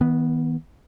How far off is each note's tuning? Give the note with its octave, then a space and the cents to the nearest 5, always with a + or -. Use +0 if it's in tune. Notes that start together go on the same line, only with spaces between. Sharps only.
D#3 +45 B3 -10